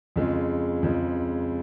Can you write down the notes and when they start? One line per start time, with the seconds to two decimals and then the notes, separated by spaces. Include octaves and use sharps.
0.16 F2 C#3 G#3
0.83 F2 C#3 G#3